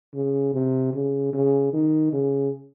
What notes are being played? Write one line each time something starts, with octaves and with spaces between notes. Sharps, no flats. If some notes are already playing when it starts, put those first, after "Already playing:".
C#3
C3
C#3
C#3
D#3
C#3